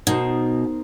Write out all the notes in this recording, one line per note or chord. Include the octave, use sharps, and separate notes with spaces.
B2 D#4 A#4 C5